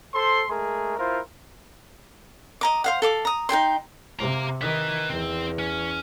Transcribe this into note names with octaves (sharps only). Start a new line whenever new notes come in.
A4 C5 C6
G#3 A3 G#4 A#4
E4 F4 A#4 C5
D#5 A#5 D6
C5 F5 F#5
A4 F5 D6
A#5 D#6
D#4 A4 G5 C6
C3 F5 A#5
D#3 B4 E5
E2 C4
C#4